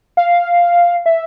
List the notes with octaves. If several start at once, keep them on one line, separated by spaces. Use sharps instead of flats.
F5
E5